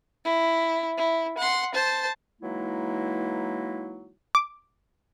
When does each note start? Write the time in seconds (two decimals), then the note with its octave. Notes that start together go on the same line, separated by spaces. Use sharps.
0.25 E4
0.98 E4
1.37 F#5 C6
1.74 C5 A5
2.42 E3 F#3 G#3 A#3 D#4 E4
4.35 D6